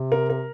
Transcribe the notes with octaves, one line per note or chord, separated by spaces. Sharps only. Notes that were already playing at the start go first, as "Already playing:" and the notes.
Already playing: C3
A#4
A#4